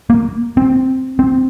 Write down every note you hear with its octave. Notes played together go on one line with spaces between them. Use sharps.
A#3
C4
C4